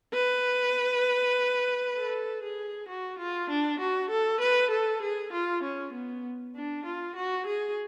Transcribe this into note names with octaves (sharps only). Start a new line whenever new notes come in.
B4
A4
G#4
F#4
F4
D4
F#4
A4
B4
A4
G#4
F4
C#4
B3
D4
F4
F#4
G#4